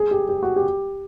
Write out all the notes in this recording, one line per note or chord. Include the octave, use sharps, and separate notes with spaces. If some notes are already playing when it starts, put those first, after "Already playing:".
Already playing: G#4
G4
G4
F#4
G4